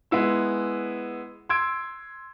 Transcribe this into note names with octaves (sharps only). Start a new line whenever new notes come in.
G#3 B3 E4 E6
C6 E6 G#6 D7